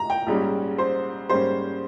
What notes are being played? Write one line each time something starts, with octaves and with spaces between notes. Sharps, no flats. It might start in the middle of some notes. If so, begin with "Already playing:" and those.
Already playing: A#5
G5
A#1 G#2 G3 C#4
C5
G#2 G3 A#3 C#4 C5